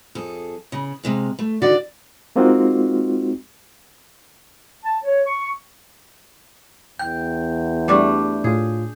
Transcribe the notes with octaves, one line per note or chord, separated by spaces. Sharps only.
F2 G#4 A4
C#3
C3 G#3 F5
A3
D3 D#3 F#4 D5
G#3 A#3 C4 D#4 F4 F#4
A5
C#5
C#6
E2 G5 G6
G3 A3 D4
A2 F4 G#4